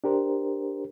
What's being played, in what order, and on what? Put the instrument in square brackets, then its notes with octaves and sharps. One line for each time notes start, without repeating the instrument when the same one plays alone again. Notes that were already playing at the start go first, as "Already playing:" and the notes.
[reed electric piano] D4 G4 A#4 C5